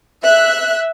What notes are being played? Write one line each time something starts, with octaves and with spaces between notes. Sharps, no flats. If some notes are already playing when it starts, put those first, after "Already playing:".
E5 F#6